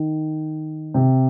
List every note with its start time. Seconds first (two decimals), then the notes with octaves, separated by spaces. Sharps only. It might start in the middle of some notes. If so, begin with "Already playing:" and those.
Already playing: D#3
0.94 C3